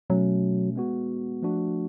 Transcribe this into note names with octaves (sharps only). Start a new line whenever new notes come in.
B2 F#3 A3 C#4
G#3 B3 F#4
F3 A3 D4 F#4